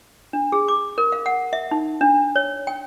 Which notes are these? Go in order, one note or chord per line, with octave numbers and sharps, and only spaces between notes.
D4
G#4
D6
A#4
F5
F#5
E5
D#4
D4
C#5
G5